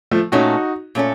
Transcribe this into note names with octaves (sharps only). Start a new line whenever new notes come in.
F3 A3
A#2 A3 C#4 D#4 F#4 A4
A#2 A3 C#4 A4